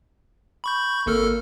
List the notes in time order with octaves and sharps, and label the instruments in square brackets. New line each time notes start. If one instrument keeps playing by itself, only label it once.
[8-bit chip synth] B5 C#6 G6
[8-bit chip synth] G#1 A4 F6 [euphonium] A#3